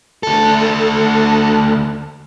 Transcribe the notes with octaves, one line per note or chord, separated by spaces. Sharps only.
D2 A4